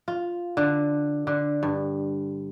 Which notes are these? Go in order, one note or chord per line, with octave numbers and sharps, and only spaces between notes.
F4
D3
D3
G2